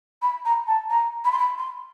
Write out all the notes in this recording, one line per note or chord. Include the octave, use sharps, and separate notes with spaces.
B5
A#5
A5
A#5
B5
C6
B5
C6